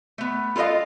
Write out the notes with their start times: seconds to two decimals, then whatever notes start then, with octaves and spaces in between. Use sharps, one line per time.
0.18 A3 B3
0.56 F4 A4 C5 D#5 F5